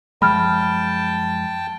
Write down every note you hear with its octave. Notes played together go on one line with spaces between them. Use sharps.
F#2 F3 G#3 G5 A5 B5 F6